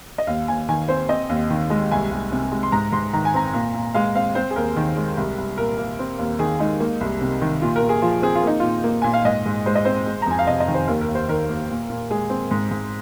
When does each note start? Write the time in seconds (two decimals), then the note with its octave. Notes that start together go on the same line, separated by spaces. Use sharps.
0.18 D#5
0.27 D#2 F5
0.48 D#2 G#5
0.69 D#3 G#5
0.88 C4 C5
1.09 C4 D#5
1.29 D#2
1.50 D#3
1.70 G#3
1.91 C2 G#5
2.11 C2
2.32 C3
2.52 G#3
2.63 C6
2.72 G#2 A#5
2.92 G#2 C6
3.13 D#3 A#5
3.25 G#5
3.34 C4 A#5
3.53 A#2
3.74 A#2
3.94 G#3 F5
4.15 C4 F5
4.35 C4 C5
4.51 G#4
4.56 D#2 A#4
4.76 D#3
4.97 G#3
5.17 C2
5.38 C2
5.57 A#2 A#4
5.78 A#3
5.99 C4
6.19 D#2
6.39 D#3 G#4
6.60 G#3 D#4
6.80 A#3
7.01 C2
7.21 C3
7.41 D#3
7.62 A#2 F4
7.76 A#4
7.82 A#2
7.89 G#4
8.02 F3 F4
8.22 C4 G#4
8.35 F4
8.43 A#3 D#4
8.60 A#2 F4
8.84 A#3
9.02 A#2 G#5
9.14 F5
9.25 G#2 D#5
9.46 G#2
9.66 G#3 C5
9.75 D#5
9.85 C4 C5
10.06 G#3
10.22 A#5
10.26 F2 G#5
10.39 F5
10.47 C3 D#5
10.60 D#5
10.68 D#3
10.74 C5
10.88 D#2 A#4
11.01 A#4
11.08 D#2
11.15 C5
11.28 D#3 A#4
11.49 A#3
11.70 A#2
11.90 A#2
12.10 G#3 G#4
12.30 C4
12.51 G#2
12.71 G#2